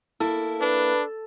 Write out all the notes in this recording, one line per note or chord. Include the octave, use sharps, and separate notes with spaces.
A#3 E4 A4
D4 B4